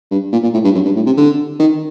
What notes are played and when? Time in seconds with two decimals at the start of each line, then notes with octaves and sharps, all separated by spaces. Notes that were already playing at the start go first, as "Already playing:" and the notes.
0.11 G2
0.33 A#2
0.43 A#2
0.54 A2
0.64 G2
0.75 F#2
0.85 G2
0.96 A2
1.06 C3
1.17 D3
1.60 D#3